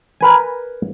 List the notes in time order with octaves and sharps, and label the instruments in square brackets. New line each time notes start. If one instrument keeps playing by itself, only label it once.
[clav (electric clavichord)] A#4 B4 G#5